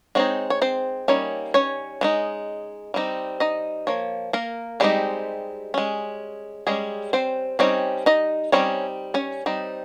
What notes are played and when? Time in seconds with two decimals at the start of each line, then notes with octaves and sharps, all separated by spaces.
0.15 G#3 C4 D#4 C#5
0.50 C#5
0.62 C4 C5
1.08 G3 A#3 C#4 D#4 C#5
1.54 C#4 C#5
2.01 G#3 C4 D#4
2.94 G3 C4 D#4
3.40 D#4 D#5
3.87 F3 A#3 C#5
4.33 A#3 A#4
4.80 G3 G#3 C4 D#4 G4
5.74 G#3 C#4
6.67 G3 G#3 C#4 G#4
7.13 C4 C5
7.59 G3 C4 C#4 D#4 C#5
8.06 D#4 D#5
8.52 G3 C4 C#4 D#4 C#5
9.14 C#4 C#5
9.46 G3 C4 D#4